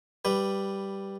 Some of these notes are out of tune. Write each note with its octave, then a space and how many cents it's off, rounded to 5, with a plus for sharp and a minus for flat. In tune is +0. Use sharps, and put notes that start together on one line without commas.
G3 +0 B4 +0